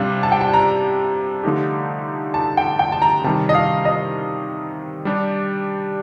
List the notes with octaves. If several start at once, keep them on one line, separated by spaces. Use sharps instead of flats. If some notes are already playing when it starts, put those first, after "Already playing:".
Already playing: C3 G3 D4 F5
A5
G5
A5
A#5
D3 F3 A3 D#4 G4
A5
G5
G5
A5
A#5
C3 D#3 G3 A5
D#5
F5
D#5
G3 D4 G4